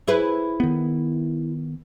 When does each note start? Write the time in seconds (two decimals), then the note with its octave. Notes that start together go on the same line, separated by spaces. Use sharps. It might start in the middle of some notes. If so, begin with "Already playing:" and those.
0.08 E4 G#4 B4
0.60 D#3 B3